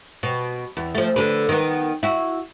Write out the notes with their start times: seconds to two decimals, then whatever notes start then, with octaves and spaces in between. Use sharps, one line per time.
0.23 B2
0.77 E2
0.95 F3 A3
1.16 D3 B4
1.49 D#3 B3
2.03 E4 F#4